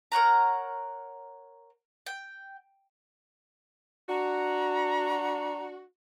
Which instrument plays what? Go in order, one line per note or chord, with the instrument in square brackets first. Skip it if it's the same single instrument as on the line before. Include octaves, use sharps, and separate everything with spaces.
[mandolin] A#4 C#5 F#5 A#5
G5
[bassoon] D4 [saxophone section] F#4 [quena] A#5